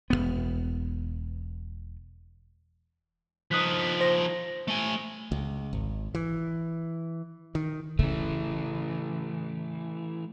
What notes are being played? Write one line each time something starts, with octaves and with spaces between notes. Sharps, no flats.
E1 E2 B3
F3 D#4 D#6 F#6 B6
C5 A#6
A3 G#5
C#2
G#1
E3
D#3
C#3 E3 A3